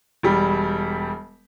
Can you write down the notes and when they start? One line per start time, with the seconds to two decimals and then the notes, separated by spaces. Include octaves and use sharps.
0.23 E1 G3